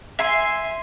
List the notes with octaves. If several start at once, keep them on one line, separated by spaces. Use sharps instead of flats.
E5 G#5 C6